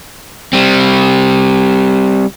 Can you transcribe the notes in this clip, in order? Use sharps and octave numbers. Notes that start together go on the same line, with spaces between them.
G3 C4